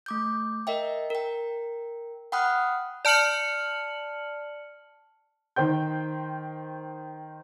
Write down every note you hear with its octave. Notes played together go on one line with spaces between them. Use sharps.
A3 D6 G6
A#4 D#5 E5 G5
A#4 G5
F#5 G5 B5 D#6 F6 F#6
D5 A5 F6 C#7 F#7
D#3 C5 G5 G6